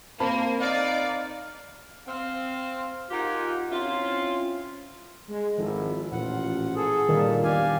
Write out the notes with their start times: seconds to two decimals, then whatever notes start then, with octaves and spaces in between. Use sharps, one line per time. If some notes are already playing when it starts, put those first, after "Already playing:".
0.20 A#3 C4 A5 B5
0.61 D#4 D5 F5
2.07 C4 F5
3.09 D#4 F4 G4 A#4 F#5 G#5
3.70 C4 C#4 E4 F4
5.29 G#3
5.58 G#1 F3 E4 A4
6.12 A1 A#2 F3 F4 F#5
6.76 G#4 A4
7.09 A#2 D#3 G3 D4
7.44 E2 D4 G4 D5 F5 G#5